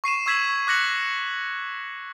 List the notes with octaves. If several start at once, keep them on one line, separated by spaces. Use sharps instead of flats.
C#6 C7 D#7 E7
C#6 E6 G#6 B6 E7 F#7
D6 F#6 A#6 C#7 F#7